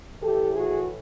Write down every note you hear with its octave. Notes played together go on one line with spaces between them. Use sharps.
A2 E3 A3 G4 A4
F#4 G#4